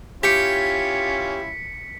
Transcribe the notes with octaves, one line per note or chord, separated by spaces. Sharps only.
C#4 E4 F4 G4 B6 C#7